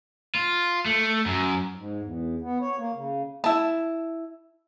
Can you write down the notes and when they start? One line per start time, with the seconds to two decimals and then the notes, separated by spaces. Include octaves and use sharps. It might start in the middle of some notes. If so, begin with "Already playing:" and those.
0.35 F4
0.86 A3
1.26 F#2
1.75 G#2
2.02 E2
2.41 B3
2.61 C#5
2.79 A#3
2.94 C#3
3.44 E4 A5